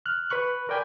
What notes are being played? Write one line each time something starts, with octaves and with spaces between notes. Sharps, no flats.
F6 F#6
B4 B5 C#6 F#6
A#4 D5 G5 G#5 B5